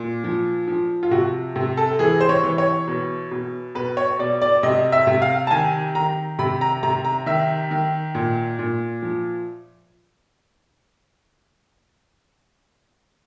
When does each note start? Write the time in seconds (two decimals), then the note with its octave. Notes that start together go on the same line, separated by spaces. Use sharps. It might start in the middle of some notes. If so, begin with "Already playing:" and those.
Already playing: A#2
0.24 F3
0.68 F3
1.03 F4
1.11 C3 F#4
1.56 C3
1.77 A4
1.99 E3 G#4
2.21 C5
2.29 C#5
2.44 E3
2.58 C#5
2.88 B2
3.31 B2
3.75 B2 B4
3.97 C#5
4.19 B2 D5
4.42 D5
4.63 C3 D#5
4.92 E5
5.07 C3
5.22 F5
5.47 A5
5.51 D#3 G#5
5.95 D#3 A#5
6.39 C3 B5
6.61 A#5
6.83 C3 A#5
7.05 A#5
7.26 D#3 E5
7.71 D#3
8.15 A#2
8.59 A#2
9.02 F3